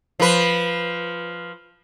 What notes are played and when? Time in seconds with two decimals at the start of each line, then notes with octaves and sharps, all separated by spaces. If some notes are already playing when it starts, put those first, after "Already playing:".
0.20 F3 B4